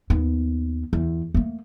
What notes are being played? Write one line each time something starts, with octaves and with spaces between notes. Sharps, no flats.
D#2 B3
E2
A3 A#3